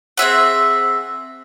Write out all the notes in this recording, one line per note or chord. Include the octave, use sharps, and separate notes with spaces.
C4 G#4 E5 F#5